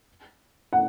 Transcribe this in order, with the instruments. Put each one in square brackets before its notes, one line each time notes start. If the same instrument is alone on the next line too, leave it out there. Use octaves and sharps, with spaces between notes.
[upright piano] F#5